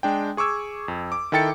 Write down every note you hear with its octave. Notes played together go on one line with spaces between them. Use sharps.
G#3 D4 G5
G#4 C#6 D6 E6 G#6
F2
D6
D#3 E4 A4 G5 A6 C#7